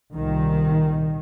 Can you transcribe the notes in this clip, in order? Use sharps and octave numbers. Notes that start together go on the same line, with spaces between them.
C2 A#2 D#3